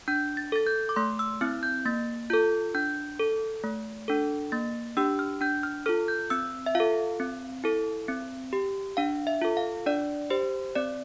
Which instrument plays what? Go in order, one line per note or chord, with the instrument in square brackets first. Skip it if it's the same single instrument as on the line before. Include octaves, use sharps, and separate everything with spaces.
[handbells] D4 G6
A6
A4 A6
G6
D6
A3 C6
E6
C4 E4 F6
G6
A#3 A6
F4 A4 G6
D4 G6
A4
A3
D4 A4
A#3 A6
D4 G4 E6
F6
D4 G6
F6
F4 A4 F6
G6
C4 E6
E5
F4 F5
A4
C4
E4 A4
C4
G4
D4 F5
E5
F4 A4
F5
D4 D5
G4 C5
C4 D5